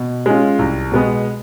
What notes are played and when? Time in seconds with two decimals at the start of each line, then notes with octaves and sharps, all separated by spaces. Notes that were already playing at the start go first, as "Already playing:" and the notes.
Already playing: B2
0.26 G#3 C#4 F4
0.59 C2
0.92 B2 G#3 B3